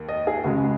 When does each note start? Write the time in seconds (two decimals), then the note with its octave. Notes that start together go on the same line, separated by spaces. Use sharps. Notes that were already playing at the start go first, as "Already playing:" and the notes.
Already playing: D#2
0.09 D#5
0.27 G#4
0.44 C#2 C#3 G#3 F#4